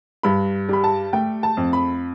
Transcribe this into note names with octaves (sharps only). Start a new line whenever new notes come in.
G2 B5
G3 B5
A5
A3 G5
A5
F2
B5